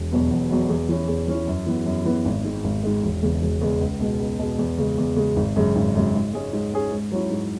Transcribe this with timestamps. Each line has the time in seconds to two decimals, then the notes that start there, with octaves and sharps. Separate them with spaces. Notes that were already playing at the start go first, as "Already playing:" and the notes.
Already playing: E1
0.12 E2 B2 F#3 B3
0.31 E1
0.50 E2 B2 F#3 B3
0.69 E2
0.89 E3 C#4 E4
1.08 E2
1.28 E3 C#4 E4
1.47 F#2
1.67 E3 B3
1.86 F#2
2.05 E3 B3
2.25 G#1
2.44 G#2 G#3
2.64 G#1
2.83 G#2 G#3
3.03 E1
3.22 E2 C#3 G#3
3.42 E1
3.61 E2 C#3 G#3
3.81 C#2
4.00 B2 G#3
4.20 C#2
4.39 B2 G#3
4.59 E2
4.78 C#3 G#3
4.98 E2
5.16 C#3 G#3
5.36 G#1
5.56 F#2 C#3 G#3
5.76 G#1
5.95 F#2 C#3 G#3
6.15 G#2
6.33 G#3 C#4 G#4
6.53 G#2
6.73 G#3 C#4 G#4
6.92 G#2
7.12 F#3 C#4 E4
7.31 G#2